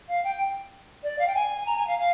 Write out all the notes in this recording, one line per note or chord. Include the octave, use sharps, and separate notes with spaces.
F5
G5
D5
F5
G5
G#5
A#5
G#5
F5
F5